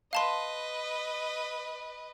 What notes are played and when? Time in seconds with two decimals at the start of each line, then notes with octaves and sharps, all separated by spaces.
0.13 B4 D#5 F5 A5 C6